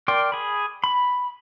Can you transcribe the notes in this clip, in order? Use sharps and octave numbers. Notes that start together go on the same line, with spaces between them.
A#4 D5 G5 C6
G#4 B5
B5